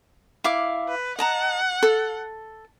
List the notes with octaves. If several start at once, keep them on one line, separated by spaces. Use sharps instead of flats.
E4 F5 D6
B4
D#5 F#5 A5 A#5
A4